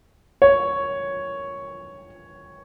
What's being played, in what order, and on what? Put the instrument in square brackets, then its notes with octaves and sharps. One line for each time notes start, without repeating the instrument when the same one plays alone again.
[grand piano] C#5